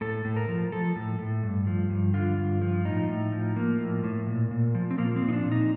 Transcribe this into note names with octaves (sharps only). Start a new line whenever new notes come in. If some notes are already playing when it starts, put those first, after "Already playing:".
A2 A4
A2
A#4
F3
F3 A4
A2
A2
G2
F3
G2
D3 F4
G2
F3
A2 D#4
A2
F3
F3 A#3
A2
A2
A#2
A#2
F3
C4
F3 A#3
C4
A#2
D#4
D4
A#2
D#4